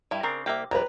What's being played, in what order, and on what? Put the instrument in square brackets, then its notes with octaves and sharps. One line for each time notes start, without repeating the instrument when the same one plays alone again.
[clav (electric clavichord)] G2 [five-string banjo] G3 E4
[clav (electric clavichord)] C#3 C4 D4 [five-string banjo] A#4
[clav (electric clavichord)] C2 A#3 [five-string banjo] G4 E5
[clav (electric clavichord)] A#1 [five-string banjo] G3 [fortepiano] B4 A#5